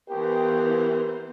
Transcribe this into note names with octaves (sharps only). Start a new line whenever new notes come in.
E3 B3 G4 A#4 C5